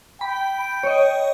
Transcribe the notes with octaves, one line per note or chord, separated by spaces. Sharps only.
G5 B5
C#5 D#5